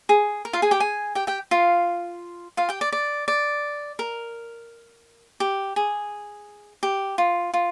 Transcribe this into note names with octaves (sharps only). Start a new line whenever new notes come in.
G#4
A#4
F4 F5
G#4 G#5
G4 G5
G#4 G#5
G4 G5
G4 G5
F4 F5
F4 F5
G4 G5
D5
D5
D5
A#4
G4
G#4
G4
F4
F4